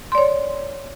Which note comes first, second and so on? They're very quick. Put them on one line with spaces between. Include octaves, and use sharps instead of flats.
C6 D5 C#5